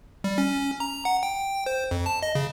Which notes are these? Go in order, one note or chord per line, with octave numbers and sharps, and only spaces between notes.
G3
C#4
A#5
F#5
G5
C5
F2
A5
D#5
C#3